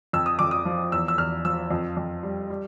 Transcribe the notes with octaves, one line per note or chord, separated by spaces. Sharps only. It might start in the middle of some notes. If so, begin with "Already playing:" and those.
F2 E6
D#6
F2 D6
D#6
F3
E2 E6
E6
E2 F6
F3 E6
F2
F2
G3
G3